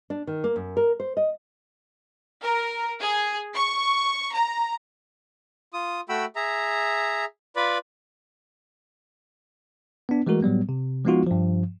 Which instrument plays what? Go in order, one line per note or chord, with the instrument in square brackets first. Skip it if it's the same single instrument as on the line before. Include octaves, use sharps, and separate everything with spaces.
[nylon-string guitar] D4
D#3
A#3
F#2
A#4
C5
D#5
[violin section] A#4
G#4
C#6
A#5
[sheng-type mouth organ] F4 D#6
A3 F#4 G5 B5 E6
G#4 E5 A#5
F4 B4 D5 B5
[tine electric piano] B3 D4
E3 G#3 A3 F#4 A#4
A2 F#3 G3 B3
C3
F3 G#3 B3 D#4 F4 F#4
G2 F3